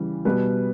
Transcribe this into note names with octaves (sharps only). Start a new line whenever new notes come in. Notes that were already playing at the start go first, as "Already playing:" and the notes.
Already playing: C#3 E3 G3
B2 G3 B4